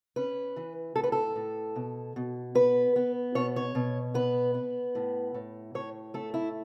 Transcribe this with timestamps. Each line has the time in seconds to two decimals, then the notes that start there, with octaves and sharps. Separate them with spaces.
0.16 C#4 B4
0.56 E3
0.96 A2 A4
1.04 B4
1.12 A4
1.36 A2
1.76 B2
2.16 B2
2.55 B3 B4
2.96 B3
3.35 B2 C#5
3.56 C#5
3.75 B2
4.14 B3 B4
4.54 B3
4.95 A2
5.34 A2
5.75 A2 C#5
6.14 A3 A4
6.34 E4